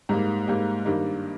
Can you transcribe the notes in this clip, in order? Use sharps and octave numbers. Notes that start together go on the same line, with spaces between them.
G#2 G3 A#3
G#2 G3 A#3
G2 D#3 G3 A#3